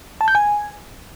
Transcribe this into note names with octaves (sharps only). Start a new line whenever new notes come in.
A5
G6
G#5